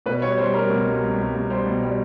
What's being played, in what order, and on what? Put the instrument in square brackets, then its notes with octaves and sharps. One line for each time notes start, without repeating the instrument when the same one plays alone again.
[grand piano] B2 B4
G3 C#5
G3 C5
G3 A#4
B2
C2
C2
C2
C2
G3 C5
B2
G3